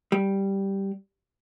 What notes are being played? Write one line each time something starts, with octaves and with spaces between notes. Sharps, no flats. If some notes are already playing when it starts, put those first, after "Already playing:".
G3